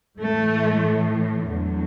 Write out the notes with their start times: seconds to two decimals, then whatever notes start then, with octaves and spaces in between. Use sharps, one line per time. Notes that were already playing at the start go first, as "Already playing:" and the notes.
0.20 A2 E3 A3
1.48 E2 D3 F#3